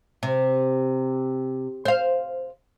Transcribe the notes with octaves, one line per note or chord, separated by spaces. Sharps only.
C3
C5 F5